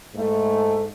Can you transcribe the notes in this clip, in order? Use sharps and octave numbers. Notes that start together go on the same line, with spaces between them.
G#2 A3